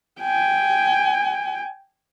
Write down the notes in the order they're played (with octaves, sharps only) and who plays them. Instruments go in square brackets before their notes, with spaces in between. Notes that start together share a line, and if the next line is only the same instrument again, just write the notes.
[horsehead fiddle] G5 G#5